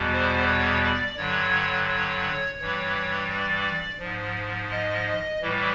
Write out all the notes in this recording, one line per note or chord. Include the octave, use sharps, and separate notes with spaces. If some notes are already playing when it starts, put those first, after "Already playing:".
Already playing: E2 B2 G3
C5
C#5
D5
G2 D3 F#3 C#5
C#5
G2 E3 G3 C#5
D5
G#2 F3
D#5
D#5
A2 E3 G3